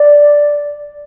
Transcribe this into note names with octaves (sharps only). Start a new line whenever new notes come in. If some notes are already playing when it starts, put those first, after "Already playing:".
Already playing: D5